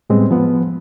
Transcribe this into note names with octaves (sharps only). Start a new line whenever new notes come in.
A2 G3 G#3 B3 C4
F3 B3